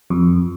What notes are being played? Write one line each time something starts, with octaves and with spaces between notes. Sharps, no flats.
F2